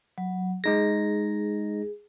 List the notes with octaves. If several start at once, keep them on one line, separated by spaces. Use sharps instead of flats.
F#3
G#3 D#4 G#4 A#6